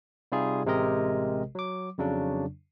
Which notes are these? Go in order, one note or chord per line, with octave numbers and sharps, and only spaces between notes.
C3 G3 D#4 F4 G#4
A1 C3 G#3 G4 A#4 D#5
F#3 D6
F2 C#3 F#3 D4